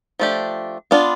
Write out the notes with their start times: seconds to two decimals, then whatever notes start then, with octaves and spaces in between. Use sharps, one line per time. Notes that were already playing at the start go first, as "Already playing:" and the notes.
0.19 F3 A3 D4 G4
0.91 B3 D4 F4